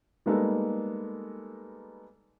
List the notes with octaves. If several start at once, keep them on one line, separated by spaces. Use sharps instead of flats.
G3 G#3 A#3 B3 D#4 A4